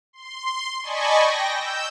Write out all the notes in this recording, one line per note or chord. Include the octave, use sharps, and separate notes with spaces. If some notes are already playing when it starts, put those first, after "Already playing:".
C6
D5 D#5 G#5 A5 B5 C#6
G5 A#6
E6 G6